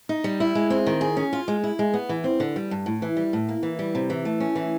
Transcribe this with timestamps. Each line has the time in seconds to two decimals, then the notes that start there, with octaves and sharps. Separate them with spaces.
0.09 D#4
0.24 G3
0.40 E4
0.55 G#3
0.70 C4
0.86 D#3
1.01 G#4
1.17 C#4
1.33 F4
1.48 G#3
1.64 E4
1.79 G#3
1.94 B3
2.09 E3
2.24 C4
2.40 D3
2.56 G3
2.71 G2
2.86 A2
3.02 E3
3.17 G3
3.33 A2
3.48 A#3
3.63 E3
3.79 G3
3.95 C3
4.10 E3
4.25 A3
4.40 C#4
4.55 E3